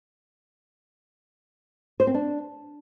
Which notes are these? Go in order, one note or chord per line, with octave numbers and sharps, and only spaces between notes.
C5
C4
D4